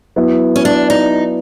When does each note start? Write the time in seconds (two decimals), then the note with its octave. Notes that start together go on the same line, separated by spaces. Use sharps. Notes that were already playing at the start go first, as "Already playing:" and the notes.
0.16 F#3 B3 E4
0.56 C#4
0.65 D4
0.90 D#4